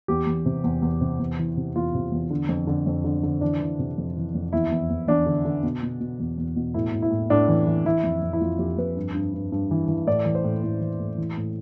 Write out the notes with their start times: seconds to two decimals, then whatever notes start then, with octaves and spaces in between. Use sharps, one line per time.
0.08 E2 G4
0.27 E2
0.46 C3
0.64 E2
0.82 E2
1.01 C3
1.19 E2
1.39 E3
1.57 C3
1.76 E2 F4
1.94 C3
2.12 E2
2.30 D3
2.49 F2
2.67 D3
2.86 F2
3.04 D3
3.23 D3
3.41 E3 D4
3.60 E3
3.79 C3
3.98 F2
4.16 E3
4.35 F2
4.53 E2 E4
4.71 E2
4.90 E2
5.08 E2 D4
5.26 D3
5.45 D3
5.63 B2
5.83 B2
6.00 B2
6.20 E2
6.38 E2
6.56 B2
6.74 A2 E4
6.94 A2
7.02 E4
7.11 A2
7.30 A2 D4
7.49 E3
7.67 E3
7.85 E3 E4
8.04 F2
8.22 F2
8.33 E4
8.40 F2 F4
8.59 F2 G4
8.78 F2 B4
8.96 G2
9.14 G2
9.34 G2
9.52 G2
9.71 E3
9.88 E3
10.07 A2 D5
10.25 E3
10.35 C5
10.44 A2
10.63 A2
10.81 E3
11.00 A2
11.18 E3
11.37 A2